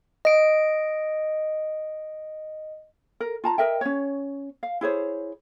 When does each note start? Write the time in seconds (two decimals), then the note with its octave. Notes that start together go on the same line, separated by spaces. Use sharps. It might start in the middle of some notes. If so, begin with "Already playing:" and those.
0.25 D#5 D7
3.20 A#4
3.44 F4 A5 A#5
3.58 A#4 D#5 E5 G5
3.81 C#4 C#5
4.63 F5
4.81 E4 G#4 C5 C#5